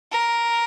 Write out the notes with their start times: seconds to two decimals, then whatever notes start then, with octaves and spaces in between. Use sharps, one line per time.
0.12 A#4